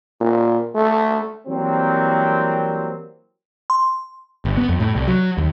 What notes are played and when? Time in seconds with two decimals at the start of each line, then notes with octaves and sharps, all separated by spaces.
0.20 A#2
0.75 A3
1.47 E3 F#3 G3 A#3 C4
3.70 C6
4.45 G1
4.57 B3
4.69 F2
4.80 A2
4.95 C2
5.08 F#3
5.38 D#2